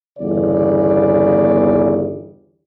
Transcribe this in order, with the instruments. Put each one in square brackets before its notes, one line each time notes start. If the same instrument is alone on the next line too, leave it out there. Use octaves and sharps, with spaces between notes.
[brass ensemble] G1 E2 C#3 D5